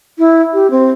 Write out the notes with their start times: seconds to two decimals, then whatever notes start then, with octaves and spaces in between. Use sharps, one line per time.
0.19 E4
0.53 G4
0.71 C4